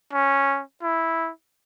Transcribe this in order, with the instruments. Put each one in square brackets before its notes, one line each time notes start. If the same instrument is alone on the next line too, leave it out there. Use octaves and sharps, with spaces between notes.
[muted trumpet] C#4
E4